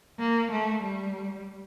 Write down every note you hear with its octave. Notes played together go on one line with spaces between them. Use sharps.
A#3
A3
G3